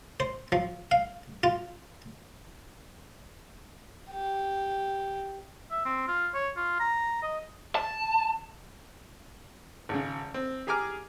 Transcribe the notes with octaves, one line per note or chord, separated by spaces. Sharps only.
C5
F3
F5
F4
G4
E5
C4
F4
C#5
F4
A#5
D#5
A5
G#1 C#3
C4
G4 G#4 G#5 A#5 D6 F6